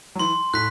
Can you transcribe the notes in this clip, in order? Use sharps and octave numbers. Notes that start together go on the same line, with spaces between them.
F#3
E3 C6
A2 F#6 B6